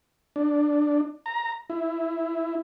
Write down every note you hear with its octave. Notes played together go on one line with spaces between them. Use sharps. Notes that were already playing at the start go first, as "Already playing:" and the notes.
D4
A#5
E4